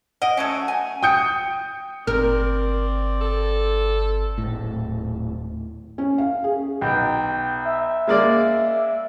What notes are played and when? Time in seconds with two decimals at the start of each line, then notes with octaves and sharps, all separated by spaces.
0.22 D#5 F#5 D7
0.37 F#3 A3 C#4
0.68 G#5
1.03 G5 D#6 G6 C#7
2.07 G1 C4 A#4 D5
3.21 A4
4.38 D#1 A2
5.98 C#4
6.18 F5
6.44 G#4
6.81 B1 G5
7.65 E5
8.08 G#3 A#3 D5